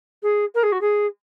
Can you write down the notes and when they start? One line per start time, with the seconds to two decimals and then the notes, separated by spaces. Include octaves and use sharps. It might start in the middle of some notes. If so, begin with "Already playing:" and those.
0.22 G#4
0.55 A#4
0.63 G#4
0.72 F#4
0.81 G#4